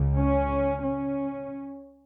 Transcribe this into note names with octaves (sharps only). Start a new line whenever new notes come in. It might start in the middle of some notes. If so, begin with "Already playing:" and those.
Already playing: C#2 C#3
C#4
C#4